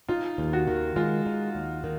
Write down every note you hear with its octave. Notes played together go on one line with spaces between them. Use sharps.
D#4 F4
D#2
F#4
D#3
G#3 F4
D#4
D#2
D#3